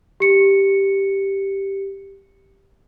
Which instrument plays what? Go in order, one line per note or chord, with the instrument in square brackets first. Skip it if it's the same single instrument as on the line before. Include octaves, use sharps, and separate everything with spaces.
[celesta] G4 C#7